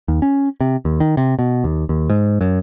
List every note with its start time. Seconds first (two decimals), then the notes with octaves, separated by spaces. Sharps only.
0.08 D#2
0.22 C#4
0.61 C3
0.85 D#2
1.00 D#3
1.17 C3
1.39 B2
1.64 D#2
1.89 D#2
2.10 G#2
2.41 F#2